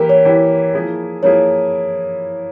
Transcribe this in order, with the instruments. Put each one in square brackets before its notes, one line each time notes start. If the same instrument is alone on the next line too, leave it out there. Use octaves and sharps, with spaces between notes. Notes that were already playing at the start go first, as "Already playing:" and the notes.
Already playing: [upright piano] E3 A#3 E4 G4 [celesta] A#4
[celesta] C#5
[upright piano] E3 A#3 E4 G4
F3 A#3 E4 G#4
[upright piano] F3 A#3 E4 G#4 [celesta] C#5